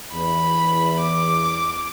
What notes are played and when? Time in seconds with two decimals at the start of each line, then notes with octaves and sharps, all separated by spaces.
0.13 E2 B5
1.00 D6